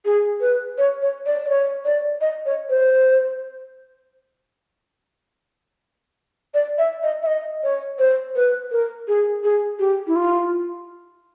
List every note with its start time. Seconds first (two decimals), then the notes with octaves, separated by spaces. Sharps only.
0.05 G#4
0.41 B4
0.78 C#5
1.02 C#5
1.26 D5
1.45 D5
1.50 C#5
1.85 D5
2.21 D#5
2.46 C#5
2.70 C5
6.54 D5
6.78 E5
7.03 D#5
7.22 E5
7.26 D#5
7.63 C#5
7.99 C5
8.36 B4
8.71 A#4
9.08 G#4
9.44 G#4
9.79 G4
10.07 E4
10.16 F4